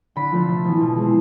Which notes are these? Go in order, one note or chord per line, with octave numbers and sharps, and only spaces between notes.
D3 B5
F3 A3 C4
C3
E3 B3
B2
G#3 C4